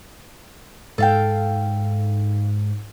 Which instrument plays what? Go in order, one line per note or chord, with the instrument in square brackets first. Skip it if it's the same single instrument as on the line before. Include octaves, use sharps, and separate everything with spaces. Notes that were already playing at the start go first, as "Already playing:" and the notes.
[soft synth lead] G#2 [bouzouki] A4 F5 G5